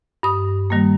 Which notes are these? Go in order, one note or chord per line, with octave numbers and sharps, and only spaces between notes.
G2 D#6
D#3 G3 A#3